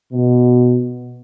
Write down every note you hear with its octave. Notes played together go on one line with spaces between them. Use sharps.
B2